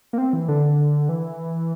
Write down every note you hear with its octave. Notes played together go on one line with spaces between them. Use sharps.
A#3
C4
E3
D3
E3